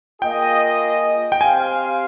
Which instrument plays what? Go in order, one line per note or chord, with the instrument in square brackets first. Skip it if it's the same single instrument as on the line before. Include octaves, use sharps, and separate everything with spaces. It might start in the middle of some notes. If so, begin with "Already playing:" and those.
[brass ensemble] A#3 F4 G#4 D#5 [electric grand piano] G5
[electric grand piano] G5
[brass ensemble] C4 G4 C5 F5 [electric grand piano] G#5